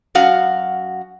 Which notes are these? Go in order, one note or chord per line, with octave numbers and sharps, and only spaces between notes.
F#2 F#4 F5